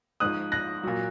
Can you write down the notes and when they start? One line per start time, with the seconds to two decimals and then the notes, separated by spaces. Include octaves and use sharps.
0.20 G#2 F3 D#6 F#6
0.52 F#6 A#6
0.83 A#2 F#3